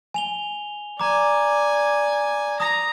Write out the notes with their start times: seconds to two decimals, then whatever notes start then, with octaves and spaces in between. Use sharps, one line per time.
0.14 G#5 F7 G7
0.99 D5 G#5 A#5 D6
2.60 A#5 D#6 A#6